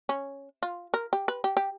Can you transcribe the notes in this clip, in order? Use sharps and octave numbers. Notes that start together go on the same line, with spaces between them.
C#4
F4
A#4
G4
B4
G4
G4